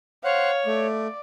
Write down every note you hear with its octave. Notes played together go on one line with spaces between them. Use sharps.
C5 C#5 F5 F#5
A3 D5